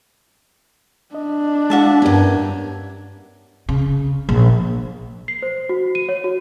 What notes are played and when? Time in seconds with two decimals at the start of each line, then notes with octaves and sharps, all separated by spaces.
1.15 D4 D#5
1.70 G#3 E4 F#4 E5 F5 A5
2.02 G2 B3 C#4 G4 A#4
3.69 C#3
4.29 A#1
5.28 C7
5.43 C5
5.69 F#4
5.95 D#7
6.09 C#5
6.24 F#4